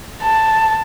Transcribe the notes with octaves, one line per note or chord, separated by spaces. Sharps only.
A5